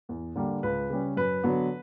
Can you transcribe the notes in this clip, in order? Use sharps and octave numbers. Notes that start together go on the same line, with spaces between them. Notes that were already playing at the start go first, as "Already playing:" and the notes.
E2
D3 G3 A#3
C#2 B4
C#3 G3 C#4
F#2 B4
D3 F#3 B3